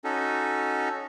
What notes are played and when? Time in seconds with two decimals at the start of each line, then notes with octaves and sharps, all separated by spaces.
0.04 C#4 D#4 F#4 A4